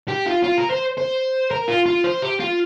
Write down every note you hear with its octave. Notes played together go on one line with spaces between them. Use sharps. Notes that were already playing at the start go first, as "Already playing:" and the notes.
G4
F4
F4
A#4
C5
C5
A#4
F4
F4
C5
G4
F4